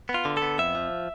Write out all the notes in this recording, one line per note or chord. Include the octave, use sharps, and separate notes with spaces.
B3
F4
D3
B3 A4
F2 E5
F3